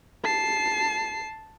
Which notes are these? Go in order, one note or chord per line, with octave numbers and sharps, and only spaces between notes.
A5 C7